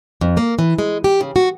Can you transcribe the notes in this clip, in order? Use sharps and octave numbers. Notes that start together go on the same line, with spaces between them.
F2
A#3
E3
G#3
G4
C#3
F#4